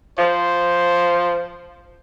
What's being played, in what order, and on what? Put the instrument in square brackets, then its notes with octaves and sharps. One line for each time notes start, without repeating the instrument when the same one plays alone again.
[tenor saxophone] F3 [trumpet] C5